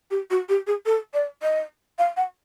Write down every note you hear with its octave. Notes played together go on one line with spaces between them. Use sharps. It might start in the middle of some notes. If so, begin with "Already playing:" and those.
G4
F#4
G4
G#4
A4
D5
D#5
F5
F#5